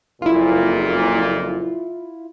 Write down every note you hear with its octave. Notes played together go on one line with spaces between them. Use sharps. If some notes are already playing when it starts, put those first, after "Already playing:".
F#1 F2 A#2 E4 F4